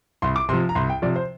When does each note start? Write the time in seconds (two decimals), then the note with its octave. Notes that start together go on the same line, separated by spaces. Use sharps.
0.22 C2 C6
0.36 D6
0.49 C3 C6
0.53 F3
0.69 A#5
0.75 C2 C6
0.89 G5
1.02 C3 F3 D5
1.16 C5